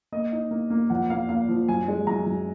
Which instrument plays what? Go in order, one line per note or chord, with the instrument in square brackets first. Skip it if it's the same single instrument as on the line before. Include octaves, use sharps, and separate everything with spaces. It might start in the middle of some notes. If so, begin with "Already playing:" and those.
[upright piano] A#3 D#5
D#4
A#3
A#3
F2 F#5
A#3 F5
A#3 F5
F3
F#2 G#5
G#3
F#2 A#5
F#2